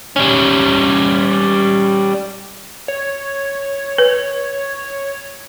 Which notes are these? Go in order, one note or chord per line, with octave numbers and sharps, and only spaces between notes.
G3 C#4
C#5
B4